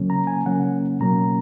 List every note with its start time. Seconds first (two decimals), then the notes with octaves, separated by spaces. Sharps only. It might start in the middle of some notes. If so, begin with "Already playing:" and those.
Already playing: C#3 F#3 A#3 C#4
0.10 A#5
0.27 G#5
0.46 C#3 F#3 A#3 C#4 F#5
1.00 B2 F#3 A#3 C#4 A#5